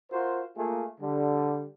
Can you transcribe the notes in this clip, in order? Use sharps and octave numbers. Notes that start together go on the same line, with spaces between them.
F4 F#4 A#4 C5
A3 A#3 F4 G#4
D3 G3